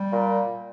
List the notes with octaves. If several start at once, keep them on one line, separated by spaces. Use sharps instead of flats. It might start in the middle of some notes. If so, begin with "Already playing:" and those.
Already playing: G3
A#2